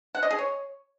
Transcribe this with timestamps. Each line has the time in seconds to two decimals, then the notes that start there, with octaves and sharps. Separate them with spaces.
0.15 F#5
0.23 D#5
0.31 G#4
0.39 C#5